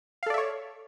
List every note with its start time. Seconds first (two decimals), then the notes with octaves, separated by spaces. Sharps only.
0.23 F5
0.26 A4
0.30 D5
0.34 E5
0.38 C#5